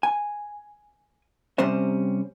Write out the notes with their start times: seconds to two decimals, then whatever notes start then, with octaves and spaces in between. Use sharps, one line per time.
0.03 G#5
1.58 C3 G3 C4 C#4 C5 E5